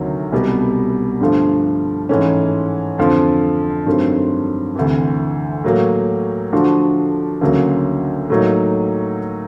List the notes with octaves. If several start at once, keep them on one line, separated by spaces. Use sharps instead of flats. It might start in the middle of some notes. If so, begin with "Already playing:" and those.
Already playing: D2 C3 D#3 F#3
C2 B2 G3 B3
G2 D3 F3 A3
G#2 E3 A3 C#4
F2 D3 F3
G2 D#3 F#3 A3 C4
D2 C3 E3
A2 F#3 A#3
D3 F3 A3 D4 F#4
D2 C#3 F#3 A#3
A2 F#3 A#3 D#4